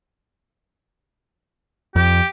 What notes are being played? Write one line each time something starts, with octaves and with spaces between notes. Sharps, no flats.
F2 G4